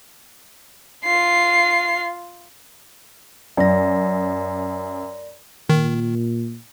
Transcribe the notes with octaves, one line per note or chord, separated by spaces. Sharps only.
F4 C7
F#2 D5 A#6
A#2 D#3